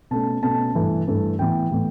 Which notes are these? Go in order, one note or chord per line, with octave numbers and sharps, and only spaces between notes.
B2 A3 C#4 A5
B2 A3 C#4 A5
G2 E3 A3
G2 E3 A3
A2 E3 B3 G5
A2 E3 B3